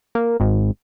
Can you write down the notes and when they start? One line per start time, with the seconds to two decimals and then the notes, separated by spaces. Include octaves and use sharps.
0.15 A#3
0.40 G#1